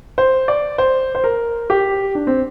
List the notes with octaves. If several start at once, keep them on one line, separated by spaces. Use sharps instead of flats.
C5
D5
C5
C5
A#4
G4
D4
C4